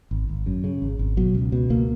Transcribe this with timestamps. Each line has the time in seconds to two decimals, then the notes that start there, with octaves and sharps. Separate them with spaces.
0.11 G#1
0.29 G#1
0.46 F#2
0.64 C#3
0.82 G#1
0.99 G#1
1.17 B2 F#3
1.35 C#2
1.52 B2
1.70 C#2 A#3